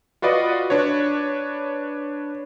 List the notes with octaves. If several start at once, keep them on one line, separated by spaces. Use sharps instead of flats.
F4 F#4 B4 D5 D#5 F#5
D4 B4 C#5